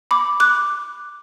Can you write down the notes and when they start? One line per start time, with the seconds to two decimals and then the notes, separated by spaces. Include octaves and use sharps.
0.11 B5 D6
0.40 D6 F#6